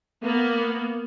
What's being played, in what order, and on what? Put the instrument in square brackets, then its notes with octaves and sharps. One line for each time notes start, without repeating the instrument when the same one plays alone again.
[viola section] A#3 B3